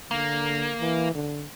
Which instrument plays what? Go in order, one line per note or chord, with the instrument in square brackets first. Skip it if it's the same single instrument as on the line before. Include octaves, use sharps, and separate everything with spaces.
[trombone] D3 [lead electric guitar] A#3
[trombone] E3
D3